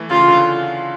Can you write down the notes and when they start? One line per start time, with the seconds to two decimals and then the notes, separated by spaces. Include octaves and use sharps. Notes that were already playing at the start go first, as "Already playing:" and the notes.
Already playing: E3 A3
0.11 C#3 F4
0.28 D3